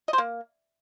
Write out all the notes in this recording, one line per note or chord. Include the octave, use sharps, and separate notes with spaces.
D#5
C5
A#3